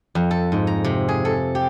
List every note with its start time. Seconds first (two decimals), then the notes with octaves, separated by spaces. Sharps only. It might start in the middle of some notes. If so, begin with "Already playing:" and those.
0.15 F2
0.31 A4
0.52 G#2
0.67 A#5
0.85 C3
1.09 G#4
1.25 A4
1.55 G4